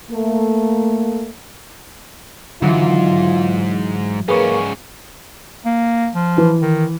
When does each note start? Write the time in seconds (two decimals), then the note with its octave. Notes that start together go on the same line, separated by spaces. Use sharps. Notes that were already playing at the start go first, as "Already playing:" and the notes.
0.11 A3 A#3
2.62 G#2 D3 E3 F#3 F4
4.29 G#2 A#3 C#4 G#4 B4 C#6
5.65 A#3
6.15 F3
6.37 E3 B4
6.62 D#3